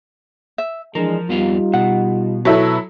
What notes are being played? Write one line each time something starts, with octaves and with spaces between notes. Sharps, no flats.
E5
E3 F3 G#3 D4 A#4
F2 G3 B3 D#4 F4 F5
B2 F#5
F#3 E4 A4 B4 C#5